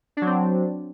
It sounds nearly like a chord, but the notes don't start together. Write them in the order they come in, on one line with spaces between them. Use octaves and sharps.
D4 F#3 C4